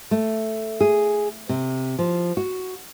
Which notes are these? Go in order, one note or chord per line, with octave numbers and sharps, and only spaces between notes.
A3
G#4
C3
F3
F#4